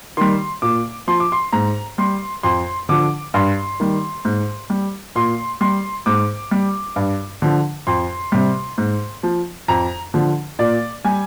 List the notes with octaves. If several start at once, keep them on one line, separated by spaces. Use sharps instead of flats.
D#3 G3 C6
A#2 D6
F3 C6
D6
C6
G#2 A#5
G3 C6
F2 C6
D3 F3 D6
G2 C6
D#3 G3
G#2
G3
A#2 C6
G3 C6
G#2 D6
G3
G2
D3 F3
F2 C6
C3 G3
G#2
F3
F2 A#5
D3 F3
A#2 D5
G3 G#5